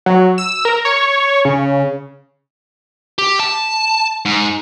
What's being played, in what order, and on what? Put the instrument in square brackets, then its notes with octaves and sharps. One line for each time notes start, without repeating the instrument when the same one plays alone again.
[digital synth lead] F#3
E6
A#4
C#5
C#3
[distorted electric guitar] G4
A5
G#2